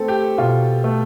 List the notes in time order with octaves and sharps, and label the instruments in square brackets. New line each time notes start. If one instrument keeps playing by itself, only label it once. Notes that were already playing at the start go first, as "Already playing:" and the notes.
Already playing: [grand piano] A3 C4 [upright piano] A4
[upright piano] G4
[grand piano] B2 [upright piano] F4
[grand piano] A3